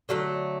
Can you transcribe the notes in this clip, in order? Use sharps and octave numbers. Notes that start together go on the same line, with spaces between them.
D3 F#3 A3 F5